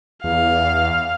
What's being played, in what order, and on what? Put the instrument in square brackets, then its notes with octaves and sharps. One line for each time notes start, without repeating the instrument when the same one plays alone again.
[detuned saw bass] E2 [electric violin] F5